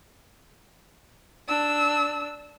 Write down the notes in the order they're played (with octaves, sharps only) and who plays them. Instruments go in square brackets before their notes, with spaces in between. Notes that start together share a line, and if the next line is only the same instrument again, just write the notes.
[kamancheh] D4 E6